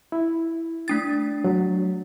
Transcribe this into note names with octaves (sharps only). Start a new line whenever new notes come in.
E4
A3 D4 A6
F#3